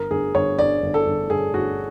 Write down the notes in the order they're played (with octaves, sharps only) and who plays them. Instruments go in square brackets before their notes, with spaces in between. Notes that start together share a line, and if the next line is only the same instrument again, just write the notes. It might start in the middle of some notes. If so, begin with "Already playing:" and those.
Already playing: [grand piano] G1 A#4
G1 G#4
G1 C#5
G1 D5
G1
A4
G1
G1 G#4
G1 F#4